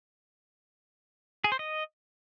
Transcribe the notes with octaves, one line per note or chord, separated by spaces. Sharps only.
G#4
C5
D#5